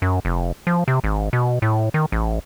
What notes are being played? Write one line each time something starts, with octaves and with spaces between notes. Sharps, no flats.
F#2
F1
F3
C3
G#1
B2
A2
D#3
A1